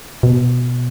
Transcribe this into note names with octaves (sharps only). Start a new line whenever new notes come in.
B2